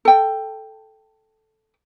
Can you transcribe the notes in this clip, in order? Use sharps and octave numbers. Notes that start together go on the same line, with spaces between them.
A4 G5